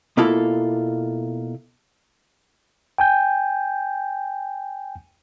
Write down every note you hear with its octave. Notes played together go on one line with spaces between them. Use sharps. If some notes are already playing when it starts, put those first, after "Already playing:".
B2 A#3 E4 F4 A4
G5 G#5 G6